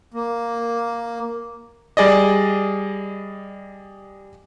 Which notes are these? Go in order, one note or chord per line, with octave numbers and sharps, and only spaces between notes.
A#3
G3 G#4 D5 D#5